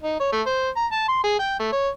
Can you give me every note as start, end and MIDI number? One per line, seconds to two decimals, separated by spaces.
0.02 0.17 63
0.20 0.30 73
0.32 0.41 57
0.46 0.69 72
0.76 0.86 82
0.92 1.05 81
1.08 1.21 84
1.24 1.39 68
1.39 1.55 79
1.59 1.70 57
1.72 1.88 73